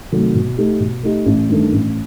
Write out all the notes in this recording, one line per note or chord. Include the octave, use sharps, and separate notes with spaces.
C3 D#3 F#3 A3
B2
A3 D#4 G4
B2
A3 D#4 G4
A1
G2 D#3 A3
A1